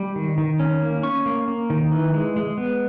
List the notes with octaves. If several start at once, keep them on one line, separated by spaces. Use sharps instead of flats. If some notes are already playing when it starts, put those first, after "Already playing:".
Already playing: G3
D#3
D#3
C#4
A#3
C#4 C#6
A#3
A#3
D#3
E3
G#3
G#3
B3